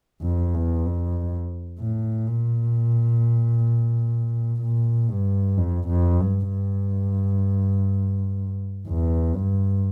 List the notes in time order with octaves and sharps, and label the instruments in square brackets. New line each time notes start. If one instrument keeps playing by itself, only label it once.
[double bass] F2
E2
F2
A2
A#2
A#2
G2
F2
F2
G2
G2
E2
G2